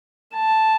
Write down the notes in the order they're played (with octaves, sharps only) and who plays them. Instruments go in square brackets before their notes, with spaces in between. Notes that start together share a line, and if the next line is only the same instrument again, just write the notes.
[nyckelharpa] A5